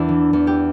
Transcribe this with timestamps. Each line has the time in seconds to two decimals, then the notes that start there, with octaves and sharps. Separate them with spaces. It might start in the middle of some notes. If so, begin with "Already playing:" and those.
Already playing: E2 D4 E4
0.09 E3
0.33 E2
0.47 G4